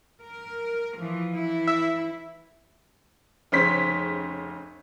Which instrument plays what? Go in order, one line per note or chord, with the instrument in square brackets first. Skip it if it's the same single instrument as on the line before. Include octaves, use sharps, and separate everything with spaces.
[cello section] A#4
E3 F3
E3 E4
[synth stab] E5
[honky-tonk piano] F1 C#3 C5 C#5 B6